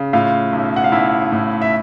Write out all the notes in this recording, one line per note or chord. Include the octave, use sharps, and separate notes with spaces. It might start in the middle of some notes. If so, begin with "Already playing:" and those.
Already playing: C#3
A2 F4 F5
B1
F#5
F5
B1 E4 E5
A2
E5